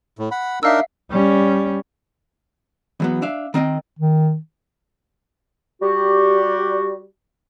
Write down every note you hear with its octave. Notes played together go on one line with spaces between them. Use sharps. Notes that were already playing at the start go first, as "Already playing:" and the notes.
A2
F#5 B5
D4 D#4 A#4 E5 F5 E6
G3 C#4
E2 F#3 B3
D4 E5 F5
D#3 C4 D#5 G5
D#3
G3 F#4 G4